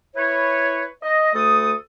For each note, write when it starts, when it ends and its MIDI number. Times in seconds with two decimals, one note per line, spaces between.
0.16 0.85 64
0.16 0.85 71
0.16 0.85 73
1.02 1.30 75
1.34 1.72 38
1.34 1.72 57
1.34 1.72 69
1.34 1.72 87